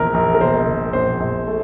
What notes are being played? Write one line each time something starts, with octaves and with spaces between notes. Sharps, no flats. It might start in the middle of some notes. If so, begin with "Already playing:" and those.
Already playing: A#1 E2 A#4
A#1
A#4
E1 C5
E1
A#1 C5
A#1
A3